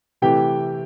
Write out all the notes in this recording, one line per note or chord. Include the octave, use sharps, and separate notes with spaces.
C3 E3 A3 G4 G5